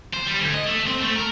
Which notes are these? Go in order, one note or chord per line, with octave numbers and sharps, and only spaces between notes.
C5
G3
D2
D#5
A3
C4
A3
A#4